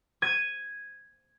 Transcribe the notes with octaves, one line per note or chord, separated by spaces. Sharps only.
G#6 D#7